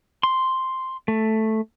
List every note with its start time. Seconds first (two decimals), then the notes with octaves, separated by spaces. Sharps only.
0.23 C6
1.08 A3